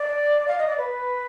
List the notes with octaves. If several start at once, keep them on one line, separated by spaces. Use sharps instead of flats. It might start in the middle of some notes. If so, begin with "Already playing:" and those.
Already playing: D5
F5
D#5
D5
B4